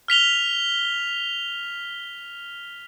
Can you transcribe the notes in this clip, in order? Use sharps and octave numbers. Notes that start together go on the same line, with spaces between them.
F6 B6 F7 G7